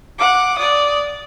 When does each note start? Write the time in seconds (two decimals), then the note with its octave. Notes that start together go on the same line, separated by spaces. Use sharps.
0.18 F#5 D6
0.57 D5 D#6